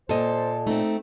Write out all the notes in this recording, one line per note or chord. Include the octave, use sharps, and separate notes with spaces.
A#2 A4 C5 D#5
A3 C4 D#4